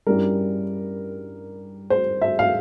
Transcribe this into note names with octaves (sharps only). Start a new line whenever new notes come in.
G2 G3 C#4 E4 A#4
C5
E5
F5